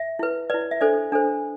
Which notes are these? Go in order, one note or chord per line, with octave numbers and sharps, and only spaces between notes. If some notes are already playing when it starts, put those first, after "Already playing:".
Already playing: E5
E4 B4
E4 B4 D5
D5
E5
D4 A4 C5 D5
D4 A4 C5